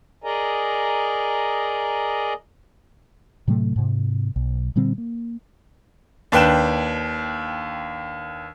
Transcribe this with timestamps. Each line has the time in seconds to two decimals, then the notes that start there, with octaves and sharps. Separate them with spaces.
0.24 G#4 A#4 D5 D#5 G#5 A#5
3.48 A2 C3 F#3 A3
3.76 G#2 C3
4.36 B1
4.76 A#2 D3 G3 C4
4.98 A#3
6.32 D#2 D4 B4 G5 E7